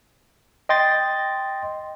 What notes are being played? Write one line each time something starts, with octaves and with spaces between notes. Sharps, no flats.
D#5 G5 C6 A6 A#6